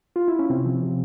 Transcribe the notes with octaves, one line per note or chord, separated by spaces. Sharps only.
F4
E4
C#4
C3 C4
F3
C3